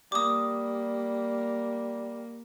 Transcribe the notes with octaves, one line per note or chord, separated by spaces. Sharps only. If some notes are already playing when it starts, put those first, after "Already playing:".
G3 A#3 D6 D#6